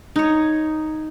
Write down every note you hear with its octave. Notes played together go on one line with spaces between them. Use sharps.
D#4 C#5